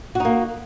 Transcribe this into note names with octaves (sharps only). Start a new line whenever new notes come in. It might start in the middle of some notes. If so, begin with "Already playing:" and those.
A#3 D#4 F#4